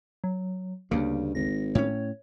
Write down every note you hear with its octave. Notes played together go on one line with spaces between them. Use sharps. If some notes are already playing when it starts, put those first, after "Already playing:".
F#3
D2 G2 C#3 A#3
G#1 A#6
A2 C#4 C#5